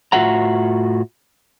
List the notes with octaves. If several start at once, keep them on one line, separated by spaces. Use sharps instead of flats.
A2 F4 F#4 E5 F#5 A#5